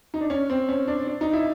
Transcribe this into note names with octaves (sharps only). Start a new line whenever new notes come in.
D#4
D4
C#4
C4
C#4
D4
D4
D#4
E4